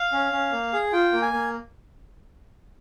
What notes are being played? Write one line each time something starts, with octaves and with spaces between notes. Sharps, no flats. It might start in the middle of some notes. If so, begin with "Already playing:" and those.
Already playing: F5
C#4
C#4
A#3
G#4
F4 G5
A#3
G#5
A#3